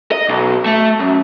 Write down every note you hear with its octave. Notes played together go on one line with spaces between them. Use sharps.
D#5
B1
A3
F#2